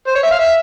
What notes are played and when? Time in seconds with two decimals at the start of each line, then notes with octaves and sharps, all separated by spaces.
0.07 C5
0.15 C#5
0.23 E5
0.31 F5
0.39 E5